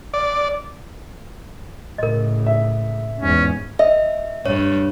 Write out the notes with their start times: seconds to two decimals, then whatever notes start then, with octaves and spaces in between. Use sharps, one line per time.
0.14 D5
1.98 A2 C#3 A#4 D#5
2.46 E5
3.20 E2 G#2 C#4
3.79 D#5 E5
4.46 G2 C#5